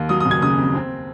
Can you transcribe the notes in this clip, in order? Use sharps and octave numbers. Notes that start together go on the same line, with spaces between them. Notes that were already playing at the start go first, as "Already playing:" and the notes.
Already playing: D#2
F#3 D#6
D#6
F#1
G#6
C#3 D#6
F2
C4